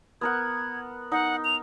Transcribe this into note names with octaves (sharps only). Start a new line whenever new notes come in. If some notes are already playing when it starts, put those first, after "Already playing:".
B3 A#4 F#5 G#6
D#4 F#5
F7